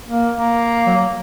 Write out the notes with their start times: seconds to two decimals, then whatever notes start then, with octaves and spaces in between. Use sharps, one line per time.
0.08 A#3
0.35 A#3
0.86 F#3